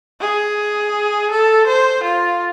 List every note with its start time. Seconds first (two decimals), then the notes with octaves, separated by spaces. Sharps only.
0.20 G#4
1.31 A4
1.67 C5
2.03 F4